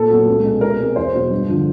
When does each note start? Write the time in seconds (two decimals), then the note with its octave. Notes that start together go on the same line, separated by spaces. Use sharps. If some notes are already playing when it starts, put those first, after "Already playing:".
Already playing: A#2 A4
0.10 F#3 B3
0.27 C#2
0.44 B2 G#3
0.61 B2 A#4
0.80 G#3 C4
0.96 E2 C5
1.14 B2 F#3
1.31 G2
1.49 D3 F3